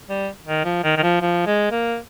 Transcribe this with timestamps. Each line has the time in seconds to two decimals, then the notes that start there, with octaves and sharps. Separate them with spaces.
0.09 G3
0.46 D#3
0.64 F3
0.84 D#3
0.97 D#3
1.03 F3
1.21 F3
1.46 G#3
1.71 A#3